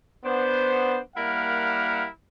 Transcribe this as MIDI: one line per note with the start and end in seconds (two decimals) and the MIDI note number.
0.25 0.98 59
0.25 0.98 62
0.25 0.98 72
1.16 2.06 55
1.16 2.06 58
1.16 2.06 64
1.16 2.06 70
1.16 2.06 77
1.16 2.06 78